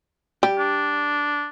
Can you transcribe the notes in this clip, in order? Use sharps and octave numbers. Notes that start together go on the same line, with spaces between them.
G3 G4
D4